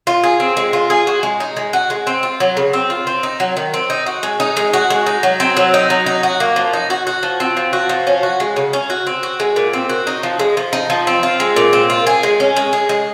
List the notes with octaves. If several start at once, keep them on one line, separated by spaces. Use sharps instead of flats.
F4
G#4
C4
G#3
F4
G#4
F#4
G#3
D#4
G#3
F#4
G#3
C4
F4
F#3
C#3
C4
F4
C4
D#4
F#3
D#3
C4
D#4
F#4
G#3
D#4
G#3
F#4
G#3
D#4
F#3
C4
F#3
D#4
F#3
D#4
F#4
A#3
F3
D#4
F#4
F#4
F3
C4
F3
F#4
F3
C#4
F#4
G#3
C#3
C#4
F#4
C4
F#4
G#3
A#2
C4
F#4
D#4
F3
G#3
F3
D#4
F3
C4
F4
G#3
A#2
C4
F4
G#4
G#3
C#4
G#3
G#4
G#3